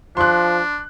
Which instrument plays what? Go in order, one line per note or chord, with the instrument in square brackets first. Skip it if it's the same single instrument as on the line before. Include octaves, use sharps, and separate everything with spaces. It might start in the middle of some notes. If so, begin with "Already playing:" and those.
[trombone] F3 [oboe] D4 [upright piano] C6 F#6